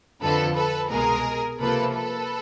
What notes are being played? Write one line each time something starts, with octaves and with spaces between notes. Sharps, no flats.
F2 D3 F3 A4 B4
A4 B4
C2 B2 G#3 G#4 A#4
C#2 C3 F3 A#3 A4 B4
A4 B4